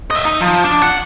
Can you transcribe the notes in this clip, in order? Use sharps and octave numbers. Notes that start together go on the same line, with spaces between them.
D#5 E5
D#4
F3
D4
F#5